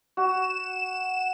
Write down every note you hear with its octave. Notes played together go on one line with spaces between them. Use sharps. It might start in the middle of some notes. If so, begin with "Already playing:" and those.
F#4 E7